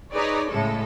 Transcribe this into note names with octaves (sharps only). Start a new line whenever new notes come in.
D#4 G#4 B4 C#5 D5
A2 C#3 G#3 A4